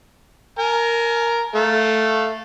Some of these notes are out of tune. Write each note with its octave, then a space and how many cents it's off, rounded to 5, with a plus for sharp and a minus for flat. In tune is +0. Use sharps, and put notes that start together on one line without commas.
A#4 +0 G#5 +40
A3 +0 F5 +0